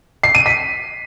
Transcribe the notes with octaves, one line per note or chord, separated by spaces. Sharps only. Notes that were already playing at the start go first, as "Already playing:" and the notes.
C7
D#7
B6